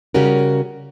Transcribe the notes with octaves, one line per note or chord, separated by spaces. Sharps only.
C#3 G3 C#4 F#4 A#4